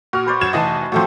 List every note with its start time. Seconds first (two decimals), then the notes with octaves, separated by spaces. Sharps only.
0.13 A#2 F#4 F6
0.26 B4 C5 D5
0.41 F#2 G#6 E7
0.53 F1 E3 D#5 A5 D#6
0.92 A2 F3 F#3 A3 C4